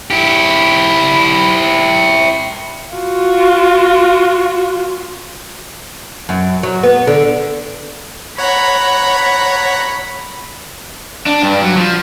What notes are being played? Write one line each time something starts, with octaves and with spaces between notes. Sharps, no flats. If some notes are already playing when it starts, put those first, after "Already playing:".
E4 G4
F4 F#4
F#2
F#3
B3
D3
C#5 F#5 A#5 B5
D4
G2
F#3
F3